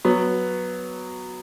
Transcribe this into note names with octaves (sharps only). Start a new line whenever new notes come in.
F#3 B3